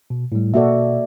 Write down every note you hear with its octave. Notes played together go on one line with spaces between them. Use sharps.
B2
A2 G3
B2 A#3 F#4 A4 D5 E5